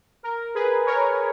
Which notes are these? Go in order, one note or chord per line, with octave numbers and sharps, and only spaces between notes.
A#4
G#4 B4
A#4 C#5